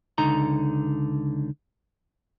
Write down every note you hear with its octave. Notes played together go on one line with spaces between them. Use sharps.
C#2 D3 D#4 A#5